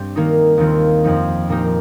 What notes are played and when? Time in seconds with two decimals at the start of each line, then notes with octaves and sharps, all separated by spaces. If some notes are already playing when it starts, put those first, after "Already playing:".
Already playing: G2 G3 C4 G4
0.16 D#3 A#3 D#4
0.57 D#2 D#3 C4 F4
1.04 F2 F3 D#4
1.49 A#2 A#3 D#4 G4